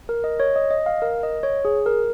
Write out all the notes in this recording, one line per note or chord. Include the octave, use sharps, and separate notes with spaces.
A#4
D#5
C#5
D#5
D#5
F5
A#4
D#5
C#5
G#4
A#4